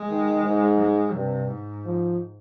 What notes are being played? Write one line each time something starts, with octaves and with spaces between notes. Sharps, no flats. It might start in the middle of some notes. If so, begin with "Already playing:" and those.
Already playing: G#3
D#3
G#2
G#3
G2 C3
G#2
F3